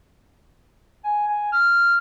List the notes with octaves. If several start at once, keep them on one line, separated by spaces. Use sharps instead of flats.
G#5
G#5
F6